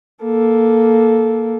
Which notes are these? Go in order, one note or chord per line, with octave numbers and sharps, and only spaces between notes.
A#3 A4